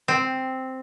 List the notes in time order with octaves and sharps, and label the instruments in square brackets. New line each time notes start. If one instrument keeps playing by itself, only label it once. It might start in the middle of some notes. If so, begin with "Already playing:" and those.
[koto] C4